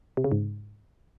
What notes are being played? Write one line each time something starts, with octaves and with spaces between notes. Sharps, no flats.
C3
C#3
G#2